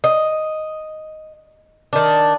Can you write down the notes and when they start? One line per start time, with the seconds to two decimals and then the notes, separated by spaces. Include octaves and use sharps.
0.04 D#5
1.93 D#3 D4